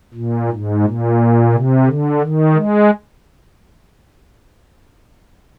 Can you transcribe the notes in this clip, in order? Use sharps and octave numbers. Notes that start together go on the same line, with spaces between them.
A#2
G#2
A#2
C3
D3
D#3
G#3